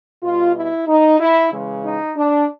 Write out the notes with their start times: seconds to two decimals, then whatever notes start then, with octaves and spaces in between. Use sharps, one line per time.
0.23 B2 G3 F4
0.54 E4
0.87 D#4
1.19 E4
1.52 C#3 E3 G#3
1.85 D#4
2.16 D4